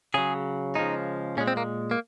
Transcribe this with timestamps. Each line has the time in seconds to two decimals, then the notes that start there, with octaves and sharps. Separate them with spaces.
0.14 C#3 F#3 G#4
0.75 C#3 F3 G#3 D#4
1.37 A#2 C#4
1.41 G#3
1.48 C4
1.57 A#3
1.91 A#3